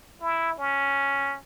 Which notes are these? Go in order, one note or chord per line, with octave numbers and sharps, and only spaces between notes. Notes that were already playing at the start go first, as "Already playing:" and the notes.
E4
C#4